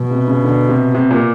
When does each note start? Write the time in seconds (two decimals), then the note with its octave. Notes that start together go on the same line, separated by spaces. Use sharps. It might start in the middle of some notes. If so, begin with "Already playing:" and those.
Already playing: B2
0.11 C3
0.28 C#3
0.44 D3
0.69 C3
0.95 C3
1.11 A#2